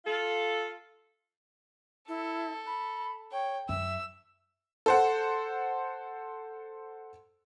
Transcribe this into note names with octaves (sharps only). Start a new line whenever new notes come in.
F4 A4
E4 A4
B5
C#5 G5
F#2 E5 E6
A4 C5 F#5